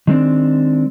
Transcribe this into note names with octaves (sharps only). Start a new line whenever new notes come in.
D#3 G#3 C4 D4